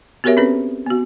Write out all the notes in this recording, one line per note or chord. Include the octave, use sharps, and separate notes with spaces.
B3 F#4 G4 A#4 C#5 E5
C4 C#4 A4 B4
B3 F#4